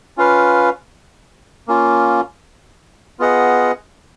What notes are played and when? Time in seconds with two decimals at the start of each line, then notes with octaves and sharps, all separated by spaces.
0.17 C#4 F4 B4 F5
1.68 A#3 C#4 F4
3.19 B3 F4 G#4 D#5 F#5